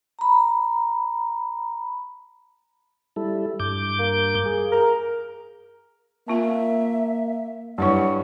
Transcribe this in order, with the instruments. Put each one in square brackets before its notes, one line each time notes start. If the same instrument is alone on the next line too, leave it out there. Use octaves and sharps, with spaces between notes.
[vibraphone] A#5 B5
[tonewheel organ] G3 E4 A4
G2 D6 G6
[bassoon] A#3
[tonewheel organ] G#4
[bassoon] A#4
[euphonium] A#3 [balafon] C4 F4 G#5 [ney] E5
[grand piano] G2 C#6 [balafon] F#3 E4 C#5 [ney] F#5